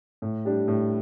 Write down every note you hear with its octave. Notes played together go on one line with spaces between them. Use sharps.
A2
G3 D4 G4
A2